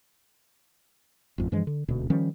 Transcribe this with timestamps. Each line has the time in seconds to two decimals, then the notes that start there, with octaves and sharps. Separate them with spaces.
1.38 G#1 F2
1.52 G2 E3 F3 G#3
1.67 D3
1.88 D#1 D2 B2
2.10 D#3 F3 G3 C#4